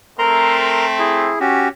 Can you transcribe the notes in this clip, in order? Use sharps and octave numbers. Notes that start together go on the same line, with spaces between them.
A3 C4 A#4 A#5 C6
E4 G#4
C#4 F#4 G4